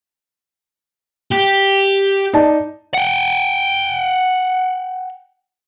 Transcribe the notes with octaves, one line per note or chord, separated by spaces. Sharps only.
G4
D#4 D5 A5
F#5 G5